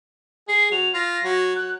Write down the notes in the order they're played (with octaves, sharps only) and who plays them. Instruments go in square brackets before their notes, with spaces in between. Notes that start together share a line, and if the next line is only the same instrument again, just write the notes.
[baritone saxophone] G#4 [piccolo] C7
[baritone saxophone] F#3 [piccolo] F7
[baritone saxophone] F4 [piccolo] A#6
[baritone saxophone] F#3
[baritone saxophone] F#3 [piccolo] F#6